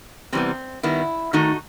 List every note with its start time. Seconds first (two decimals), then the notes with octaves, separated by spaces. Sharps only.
0.33 C3 E3 G3 B3 C4
0.83 D#3 G3 B3 E4
1.33 D#3 A3 D#4 F#4